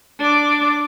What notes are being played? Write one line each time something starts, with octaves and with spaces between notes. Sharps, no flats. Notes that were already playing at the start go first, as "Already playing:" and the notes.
D4 D6